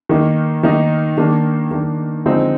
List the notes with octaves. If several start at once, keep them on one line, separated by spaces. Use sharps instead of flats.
D#3 A#3 D#4
D#3 A#3 D#4
D#3 A#3 D4
D#3 A#3 D4
D3 F3 G#3 C4 D#4